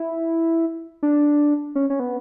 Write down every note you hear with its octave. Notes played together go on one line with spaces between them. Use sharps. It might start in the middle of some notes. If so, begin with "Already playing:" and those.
Already playing: E4
D4
C#4
C#4
B3